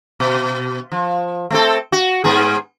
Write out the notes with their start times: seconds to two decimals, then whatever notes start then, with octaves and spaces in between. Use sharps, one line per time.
0.20 B2
0.92 F3
1.50 A3 C4 A4
1.92 F#4
2.24 G#2 B3 G#4